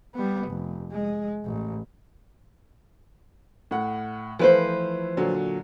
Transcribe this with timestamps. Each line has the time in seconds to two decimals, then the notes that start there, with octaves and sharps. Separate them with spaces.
0.14 G3 B3
0.48 F1
0.92 G#3
1.45 A1
3.71 A2 F#5
4.39 E3 F3 A3 B4 C5
5.17 A#2 D3 F#3